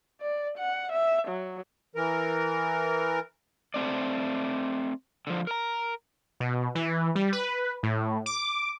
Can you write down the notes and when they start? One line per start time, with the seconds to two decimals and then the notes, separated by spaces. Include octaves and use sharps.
0.22 D5
0.58 F#5
0.93 E5
1.28 F#3
1.95 E3 A#4
3.74 A3 C4 D5
5.27 D3 F3
5.47 A#4 A#5
6.40 B2
6.75 E3
7.15 G3
7.33 B4
7.83 A2
8.26 D6